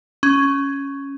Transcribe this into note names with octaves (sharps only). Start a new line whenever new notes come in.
C#4